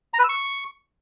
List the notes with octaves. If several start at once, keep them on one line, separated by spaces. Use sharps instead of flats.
A#5
B4
E6
C#6